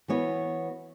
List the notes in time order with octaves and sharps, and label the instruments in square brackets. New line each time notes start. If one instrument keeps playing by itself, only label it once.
[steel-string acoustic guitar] E3 B3 F#4 C#5